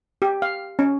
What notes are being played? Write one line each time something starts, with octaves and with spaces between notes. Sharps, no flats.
G4
F5
C#4